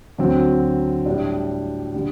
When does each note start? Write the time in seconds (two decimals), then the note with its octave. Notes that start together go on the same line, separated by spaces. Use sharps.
0.18 D2 D3 F#3 C4
1.06 A2 G3 D4
1.94 D3 G3